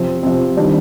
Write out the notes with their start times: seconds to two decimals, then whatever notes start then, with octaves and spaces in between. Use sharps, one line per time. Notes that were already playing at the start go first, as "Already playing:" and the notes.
Already playing: C3 F3 C4
0.23 C3 F3 C4
0.57 D#3 G3 D4